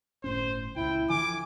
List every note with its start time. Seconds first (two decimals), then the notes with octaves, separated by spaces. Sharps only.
0.24 G1 A2 C#4 C5
0.76 C#2 A#2 E4 G5
1.10 D3 E3 F3 G#5 D6